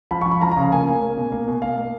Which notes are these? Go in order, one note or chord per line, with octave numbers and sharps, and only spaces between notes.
F3 B5
C#6
F3
B5
F3 A#5
A#5
C#3
F5
A#3 G#5
A#3
A#3
B2
A#3
B2
A#3 F5
A#3